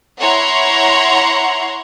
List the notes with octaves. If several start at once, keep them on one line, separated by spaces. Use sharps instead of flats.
E4 C#5 F#5 A#5 C6